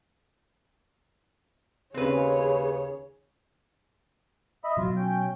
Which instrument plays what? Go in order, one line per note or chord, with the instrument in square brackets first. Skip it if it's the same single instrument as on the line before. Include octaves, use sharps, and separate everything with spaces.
[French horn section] D#2 C#3 [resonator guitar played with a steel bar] C4 B4 [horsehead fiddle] G#4 C#5
[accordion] D#5 E5 B5
[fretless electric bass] B2 F#3 [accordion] F4
[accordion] C#4 G5